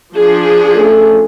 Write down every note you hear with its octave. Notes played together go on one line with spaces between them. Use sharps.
F3 D4 G#4
A3 C#4 A4